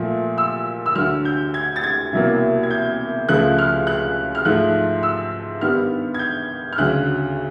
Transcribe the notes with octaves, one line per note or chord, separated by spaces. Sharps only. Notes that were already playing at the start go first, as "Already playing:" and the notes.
Already playing: A#2 F3 A3
E6
E6
D2 D3 F#3 F6
G6
G#6
A6
G#6
C2 B2 F#3 A#3
G#6
G6
C#2 C#3 F3 A3 F#6
F6
F#6
F6
G#2 F3 A3 F#6
E6
G2 D#3 G3 B3 F6
G#6
G6
F6
D2 C#3 F#3 F#6